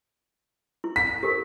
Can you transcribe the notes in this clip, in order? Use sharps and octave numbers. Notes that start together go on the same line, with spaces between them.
E4
B6
G4 A4 A#4